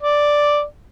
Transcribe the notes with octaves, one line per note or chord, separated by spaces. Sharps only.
D5